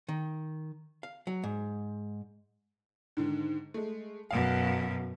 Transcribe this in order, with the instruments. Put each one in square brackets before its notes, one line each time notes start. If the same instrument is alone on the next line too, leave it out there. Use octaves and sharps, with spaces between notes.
[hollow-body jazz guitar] D#3
F5
F#3
G#2
[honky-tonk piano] G#2 D3 D#3
G#3 A3
[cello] F#2 B2 [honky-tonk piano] F5